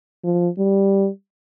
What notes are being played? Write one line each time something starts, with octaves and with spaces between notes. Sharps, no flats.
F3
G3